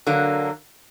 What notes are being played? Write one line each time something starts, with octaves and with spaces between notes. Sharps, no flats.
D3 F#3 A#3